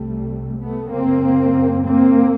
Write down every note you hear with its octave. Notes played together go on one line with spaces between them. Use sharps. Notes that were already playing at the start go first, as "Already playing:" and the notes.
Already playing: C2 C3 G3 A3
A3 B3
F#2 C#3 A#3 C4
A#3 C4